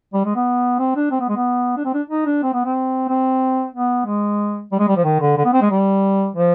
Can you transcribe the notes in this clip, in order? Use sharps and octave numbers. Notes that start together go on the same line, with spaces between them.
G3
G#3
B3
C4
D4
C4
B3
G#3
B3
D4
C4
D4
D#4
D4
C4
B3
C4
C4
B3
G#3
G3
G#3
G3
F3
D#3
D3
D3
B3
C4
G#3
G3
F3